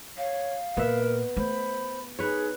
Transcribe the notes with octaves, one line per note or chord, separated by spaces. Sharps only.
C#5 F5
A#2 B3 A#4 E5
A3 C5 B5
D#4 G#4 B4 C#5